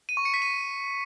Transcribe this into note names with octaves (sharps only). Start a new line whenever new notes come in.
D#7
C#6
C#7
B6
D#7